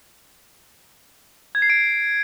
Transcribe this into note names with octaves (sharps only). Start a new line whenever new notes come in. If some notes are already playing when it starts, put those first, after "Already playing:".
G#6
C7
D7